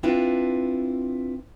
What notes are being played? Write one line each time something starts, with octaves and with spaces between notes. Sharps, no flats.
C4 D4 E4 F4 B4